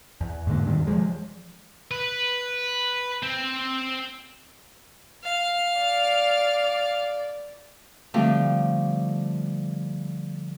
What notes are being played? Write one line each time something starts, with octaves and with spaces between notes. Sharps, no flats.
E2
G#2 D3 A#3
E2 G2 C3 D#3
E3 F3 G#3
B4
C4
F5
D5
D3 F3 G3 A3 C4